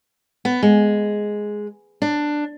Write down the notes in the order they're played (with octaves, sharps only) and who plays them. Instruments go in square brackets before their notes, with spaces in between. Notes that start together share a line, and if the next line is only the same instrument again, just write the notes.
[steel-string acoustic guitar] B3
G#3
D4